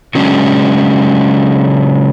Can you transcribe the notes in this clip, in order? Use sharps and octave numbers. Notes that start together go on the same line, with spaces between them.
C#3 F#3 G#3 C#4 D4